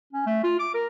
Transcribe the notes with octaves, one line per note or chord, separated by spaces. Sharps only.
C#4
A3
F4
D6
A#4